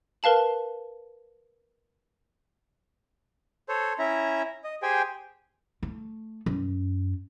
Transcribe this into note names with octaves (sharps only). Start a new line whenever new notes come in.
A#4 B4 F5 A5 F#7
A4 C5 C#5
C#4 E4 E5 A#5
D#5
G4 G#4 C5 G5 G#5
A3
F#2